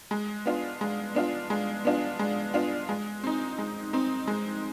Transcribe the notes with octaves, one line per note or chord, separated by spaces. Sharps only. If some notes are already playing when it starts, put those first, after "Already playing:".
G#3
B3 D4 F4
G#3
B3 D4 F4
G#3
B3 D4 F4
G#3
B3 D4 F4
G#3
C4 D#4
G#3
C4 D#4
G#3